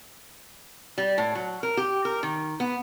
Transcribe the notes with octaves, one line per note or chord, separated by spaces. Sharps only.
G3
A2
F#3
A#4
G4
A#4
D#3
B3